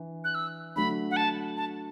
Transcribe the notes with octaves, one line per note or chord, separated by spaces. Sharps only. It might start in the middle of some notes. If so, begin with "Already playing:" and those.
Already playing: E3 D4
F#6
E6
D3 F#3 A3 D4 B5
F#5
A5
A5